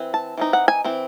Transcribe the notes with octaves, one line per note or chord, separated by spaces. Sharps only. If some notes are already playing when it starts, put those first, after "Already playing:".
Already playing: E3 C4
A5
E3 C4 D#4
F#5
G#5
E3 C4